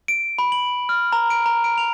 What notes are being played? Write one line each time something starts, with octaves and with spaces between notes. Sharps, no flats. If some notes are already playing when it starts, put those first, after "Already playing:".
D7
B5
F#7
F6
A#5
D7
A#5
D7
F7